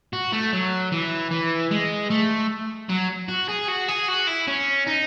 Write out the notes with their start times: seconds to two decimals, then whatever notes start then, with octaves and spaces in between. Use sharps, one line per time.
0.13 F#4
0.32 A3
0.52 F#3
0.92 E3
1.31 E3
1.71 G#3
2.10 A3
2.90 F#3
3.29 F#4
3.49 G#4
3.68 F#4
3.88 G#4
4.08 F#4
4.27 E4
4.48 C#4
4.87 D#4